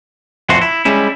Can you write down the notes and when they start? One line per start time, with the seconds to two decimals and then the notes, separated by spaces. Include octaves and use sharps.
0.49 F2 A2 E3 F#4 C6
0.61 E4
0.85 G3 G#3 C#4 E4